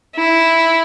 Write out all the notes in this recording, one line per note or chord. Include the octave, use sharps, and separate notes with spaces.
E4